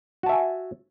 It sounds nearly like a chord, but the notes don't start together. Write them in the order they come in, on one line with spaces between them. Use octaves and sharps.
F#4 A5 E5 G#5